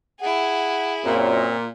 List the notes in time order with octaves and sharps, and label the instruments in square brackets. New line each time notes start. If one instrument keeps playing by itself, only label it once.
[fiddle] E4 G#4 [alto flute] F#5
[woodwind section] F#2 [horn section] A#2 [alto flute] C4